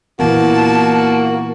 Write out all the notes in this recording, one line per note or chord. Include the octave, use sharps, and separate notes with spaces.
A#2 E3 A#3 B3 F#4 A5